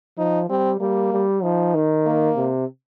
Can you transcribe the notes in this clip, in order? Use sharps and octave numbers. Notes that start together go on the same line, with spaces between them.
F3 D#4
G3 C4
G3 A#3
G3
F3 D#4
D#3
A#3
C3